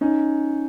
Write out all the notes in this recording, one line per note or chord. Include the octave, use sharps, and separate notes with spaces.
C#4 D#4